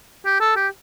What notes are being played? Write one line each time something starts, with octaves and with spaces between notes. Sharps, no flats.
G4
A4
G4